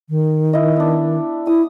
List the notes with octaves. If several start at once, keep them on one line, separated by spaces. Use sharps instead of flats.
D#3
E4 D#5
B3 D4
E4 D#6